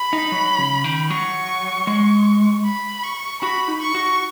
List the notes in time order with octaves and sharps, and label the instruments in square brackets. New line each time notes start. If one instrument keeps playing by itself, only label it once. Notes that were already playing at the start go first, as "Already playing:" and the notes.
Already playing: [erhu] B5
[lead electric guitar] D#4
F#3
C#3
D#3
[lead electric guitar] F#3 [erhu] C#6
[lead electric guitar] G#3
[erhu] B5
C#6
[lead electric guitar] F#4 [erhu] B5
[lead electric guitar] D#4
[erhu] C#6
[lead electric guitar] F#4